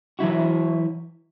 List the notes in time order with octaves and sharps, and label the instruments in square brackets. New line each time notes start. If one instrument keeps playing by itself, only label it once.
[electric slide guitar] E3 F#3 E4 F#4